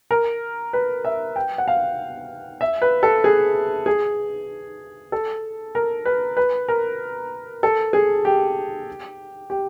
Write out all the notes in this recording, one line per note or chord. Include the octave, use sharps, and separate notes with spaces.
A#4
B4
E5
G5
F#5
F5
E5
B4
A4
G#4
G#4
A4
A#4
B4
B4
A#4
A4
G#4
G4
G4